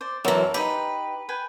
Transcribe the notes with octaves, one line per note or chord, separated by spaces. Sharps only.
C5 D5
F#2 E3 F#4 A4 A#4
D#4 E4 G4 B4
B4 G5 G#5